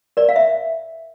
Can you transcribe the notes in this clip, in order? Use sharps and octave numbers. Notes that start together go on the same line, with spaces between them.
A#4 D5
F5
E5